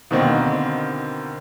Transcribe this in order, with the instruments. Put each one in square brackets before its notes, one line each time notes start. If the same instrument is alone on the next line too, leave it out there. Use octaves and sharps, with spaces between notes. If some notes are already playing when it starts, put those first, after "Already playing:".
[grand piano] B2 D3 D#3 A#3 C4